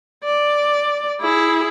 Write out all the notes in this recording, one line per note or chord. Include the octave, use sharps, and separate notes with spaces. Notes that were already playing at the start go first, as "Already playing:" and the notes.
D5
E4 G#4